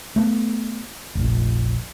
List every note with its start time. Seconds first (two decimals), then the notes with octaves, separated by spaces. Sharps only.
0.16 A3 B3
1.15 F1 A#1